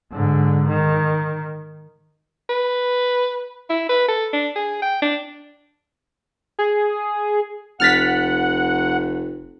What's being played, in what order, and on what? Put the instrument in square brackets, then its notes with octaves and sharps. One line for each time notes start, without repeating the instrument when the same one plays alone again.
[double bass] G#2 D3
D#3
[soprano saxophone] B4
E4
B4
A4
D4
G#4
G5
D4
[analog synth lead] G#4
[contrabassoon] F1 [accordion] F#5 [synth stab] F6 A6 B6